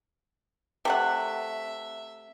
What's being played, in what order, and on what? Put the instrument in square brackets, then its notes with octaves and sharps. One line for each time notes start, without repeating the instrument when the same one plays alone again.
[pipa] C3 A3 F#5 [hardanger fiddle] E5